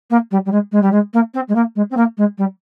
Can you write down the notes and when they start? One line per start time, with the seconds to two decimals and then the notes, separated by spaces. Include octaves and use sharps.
0.10 A#3
0.31 G3
0.46 G3
0.52 G#3
0.72 G#3
0.82 G3
0.92 G#3
1.14 A#3
1.34 C4
1.49 G#3
1.55 A#3
1.76 G#3
1.91 C4
1.97 A#3
2.18 G#3
2.38 G3